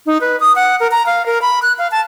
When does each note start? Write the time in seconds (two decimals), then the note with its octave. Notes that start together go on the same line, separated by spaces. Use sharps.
0.06 D#4
0.21 B4
0.40 D#6
0.56 F#5
0.80 A#4
0.91 A#5
1.06 F5
1.26 A#4
1.42 B5
1.62 F#6
1.78 F5
1.92 A5